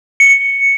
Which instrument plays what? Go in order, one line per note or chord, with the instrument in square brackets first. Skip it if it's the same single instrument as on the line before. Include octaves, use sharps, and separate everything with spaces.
[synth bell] C#7